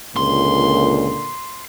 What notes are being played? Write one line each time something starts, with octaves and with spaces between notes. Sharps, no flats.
C#2 A#2 D3 A#3 C6